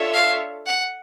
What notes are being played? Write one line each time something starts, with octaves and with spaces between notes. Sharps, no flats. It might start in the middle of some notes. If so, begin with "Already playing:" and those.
Already playing: D4 F4 A4 C#5 E5
F5
F#5